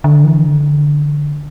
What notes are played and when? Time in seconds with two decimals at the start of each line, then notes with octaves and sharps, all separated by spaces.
0.04 D3
0.25 E3
0.46 D3